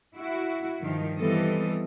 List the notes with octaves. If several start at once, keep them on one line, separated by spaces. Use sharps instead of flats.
E4 F#4
G2 D#3 F3
E3 G3 B3 C4 A4 D#5